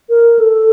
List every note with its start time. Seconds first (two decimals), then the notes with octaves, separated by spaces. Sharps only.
0.09 A#4
0.39 A4